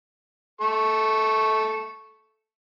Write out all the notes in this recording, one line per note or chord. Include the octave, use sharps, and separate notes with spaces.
A4 C#6